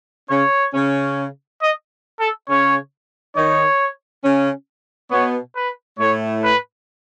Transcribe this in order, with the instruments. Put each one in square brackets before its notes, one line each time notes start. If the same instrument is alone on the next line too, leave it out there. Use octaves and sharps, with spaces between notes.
[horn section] C#3 C#4 [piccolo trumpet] C#5
[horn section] C#3 C#4
[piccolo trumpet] D#5
A4
[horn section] C#3 C#4 [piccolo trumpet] C#5
[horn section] D#3 D#4 [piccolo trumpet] C#5
[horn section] C#3 C#4
[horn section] B2 B3 [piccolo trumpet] C#5
[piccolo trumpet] B4
[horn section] A2 A3 [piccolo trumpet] C#5
[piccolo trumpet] B4